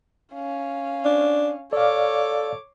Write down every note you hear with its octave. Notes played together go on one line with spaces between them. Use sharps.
C#4 F5
D4
A4 C#5 D5 F5 D6